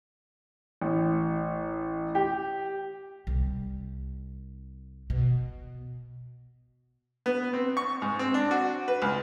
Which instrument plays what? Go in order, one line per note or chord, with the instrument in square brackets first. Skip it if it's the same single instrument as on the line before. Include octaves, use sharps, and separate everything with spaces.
[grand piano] A1
G4
[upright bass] C2
B2
[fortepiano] B3
C4
C#6
G#2
C4
D4
F#4
B4
C#2